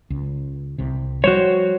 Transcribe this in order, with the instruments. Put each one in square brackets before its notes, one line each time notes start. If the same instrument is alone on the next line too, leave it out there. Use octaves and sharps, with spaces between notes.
[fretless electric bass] C#2
C2 C3
[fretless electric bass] F3 G3 [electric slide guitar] F#4 C5 C#5